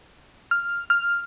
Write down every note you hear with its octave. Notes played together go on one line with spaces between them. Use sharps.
F6
F6